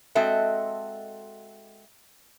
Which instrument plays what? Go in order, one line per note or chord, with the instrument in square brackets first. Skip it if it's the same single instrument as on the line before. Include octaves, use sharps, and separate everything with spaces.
[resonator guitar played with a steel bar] G#3 C4 F#4 A4 D#5 E5